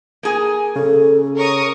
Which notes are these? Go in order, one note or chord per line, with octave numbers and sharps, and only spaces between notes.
A#3 G#4 G#5
C#3 A4
A#4 C#5 C#6 D#6